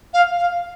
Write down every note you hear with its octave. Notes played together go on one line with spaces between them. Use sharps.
F5
F5